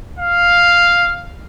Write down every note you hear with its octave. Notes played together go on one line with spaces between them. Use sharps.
F5